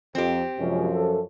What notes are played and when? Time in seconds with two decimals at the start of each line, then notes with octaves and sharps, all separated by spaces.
0.15 F2 C4 G4
0.59 F#2 C3 F3 G#3 C#4
0.94 A4